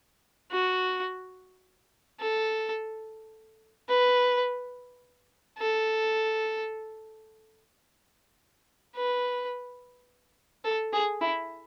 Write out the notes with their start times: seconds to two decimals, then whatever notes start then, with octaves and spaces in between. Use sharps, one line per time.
0.51 F#4
2.20 A4
3.89 B4
5.58 A4
8.96 B4
10.65 A4
10.93 G#4
11.21 E4